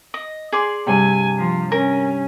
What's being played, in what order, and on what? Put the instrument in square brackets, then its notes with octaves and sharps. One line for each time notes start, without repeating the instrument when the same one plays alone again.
[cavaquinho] D#5
G#4 D5 C6
[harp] G2 C3 [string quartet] G#5
[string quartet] F3
[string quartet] C#4 [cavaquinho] A#4